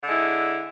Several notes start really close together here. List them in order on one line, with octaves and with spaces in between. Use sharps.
D3 G#3 E4